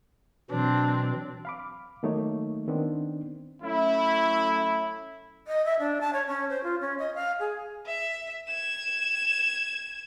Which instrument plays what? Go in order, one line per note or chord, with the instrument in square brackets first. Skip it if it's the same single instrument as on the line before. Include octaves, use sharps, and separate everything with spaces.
[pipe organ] B2 E3 F#3 [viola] C4 D4
[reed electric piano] F5 B5 D6
D#3 F#3 A3 A#3 D#4 C#5
D#3 B3 C4 D4
[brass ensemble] F#3 A3 C#4 E4
[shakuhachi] D#5
E5
D4
A5
C#5
C#4
C5
F4
C#4
D#5
F5
G#4
[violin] E5
G#6 E7